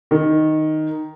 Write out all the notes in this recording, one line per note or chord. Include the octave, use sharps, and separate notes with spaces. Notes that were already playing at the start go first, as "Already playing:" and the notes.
D#3